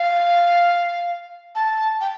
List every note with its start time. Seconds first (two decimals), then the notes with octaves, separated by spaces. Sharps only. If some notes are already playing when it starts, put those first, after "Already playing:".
Already playing: F5
1.55 A5
2.01 G5